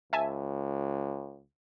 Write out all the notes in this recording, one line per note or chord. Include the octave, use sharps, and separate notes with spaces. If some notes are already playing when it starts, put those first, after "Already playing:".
C#2 E5 G#5 A5